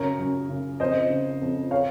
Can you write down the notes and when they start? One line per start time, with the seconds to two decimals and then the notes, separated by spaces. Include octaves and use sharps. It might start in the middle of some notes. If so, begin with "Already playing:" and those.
Already playing: F#2 C#3 A#4 C#5
0.19 F#2
0.49 C#3
0.80 F2 C5 D#5
1.10 C#3
1.42 F2
1.71 C#5 F5